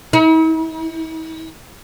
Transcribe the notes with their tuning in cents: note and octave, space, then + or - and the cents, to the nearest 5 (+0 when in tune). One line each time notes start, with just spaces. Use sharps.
E4 -45